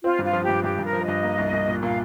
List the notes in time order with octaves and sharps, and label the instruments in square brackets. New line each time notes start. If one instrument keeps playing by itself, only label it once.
[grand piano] C4 [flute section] F4
[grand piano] G2 [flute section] F4
[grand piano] F3
[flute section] G4
[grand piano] G2
[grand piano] G2 [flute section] G4
[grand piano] G2
[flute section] A#4
[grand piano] F3
[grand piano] G2 [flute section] D#5
[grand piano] A#3
C2
C2
A#2
[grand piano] A#2 [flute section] F5